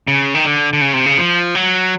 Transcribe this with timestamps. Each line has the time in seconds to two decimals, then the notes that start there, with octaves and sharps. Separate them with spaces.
0.08 C#3
0.35 D#3
0.45 D3
0.73 D3
0.81 C#3
0.94 C3
1.06 C#3
1.18 F3
1.55 F#3